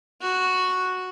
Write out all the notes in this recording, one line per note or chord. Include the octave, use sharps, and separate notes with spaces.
F#4